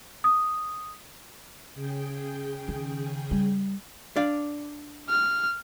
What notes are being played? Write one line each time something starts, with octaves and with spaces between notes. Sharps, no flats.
D#6
C#3 G#4 G5
D#3
G3
D4 D5 F5
F6